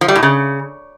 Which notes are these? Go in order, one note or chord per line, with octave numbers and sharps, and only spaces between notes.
F3
G3
A2
C#3